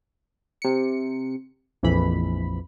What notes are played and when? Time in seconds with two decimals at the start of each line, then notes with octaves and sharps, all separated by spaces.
0.62 C3 C#7
1.83 A#1 F2 E3 B5